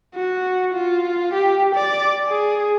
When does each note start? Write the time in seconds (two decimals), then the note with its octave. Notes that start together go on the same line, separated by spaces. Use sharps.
0.15 F#4
0.75 F4
1.33 G4
1.75 D5
2.29 G#4